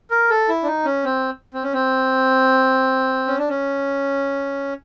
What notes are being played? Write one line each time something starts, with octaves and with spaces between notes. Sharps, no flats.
A#4
A4
E4
D4
D#4
C#4
C4
C4
C#4
C4
C#4
D4
C#4